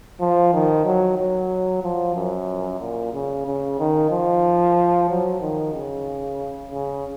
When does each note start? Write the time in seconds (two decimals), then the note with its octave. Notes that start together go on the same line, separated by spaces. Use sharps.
0.21 F3
0.53 D#3
0.85 F#3
1.18 F#3
1.83 F3
2.16 F#2
2.80 A#2
3.13 C#3
3.46 C#3
3.79 D#3
4.11 F3
5.09 F#3
5.41 D#3
5.74 C#3
6.71 C#3